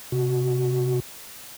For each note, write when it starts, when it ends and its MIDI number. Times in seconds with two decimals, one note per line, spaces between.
0.12 1.00 48
0.12 1.00 66